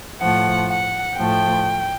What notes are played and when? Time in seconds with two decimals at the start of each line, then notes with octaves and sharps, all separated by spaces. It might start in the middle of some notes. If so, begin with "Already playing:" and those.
0.21 A2 F3 A3 F#5
0.69 F#5
1.17 A2 F3 A3 G5